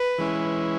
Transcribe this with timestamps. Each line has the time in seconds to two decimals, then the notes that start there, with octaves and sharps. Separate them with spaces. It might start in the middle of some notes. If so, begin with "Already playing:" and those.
Already playing: B4
0.18 E3 G#3 C#4 E4